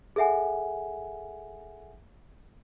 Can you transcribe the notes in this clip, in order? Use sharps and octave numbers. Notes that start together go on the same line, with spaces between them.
G#4 A4 E5 F#5 G#5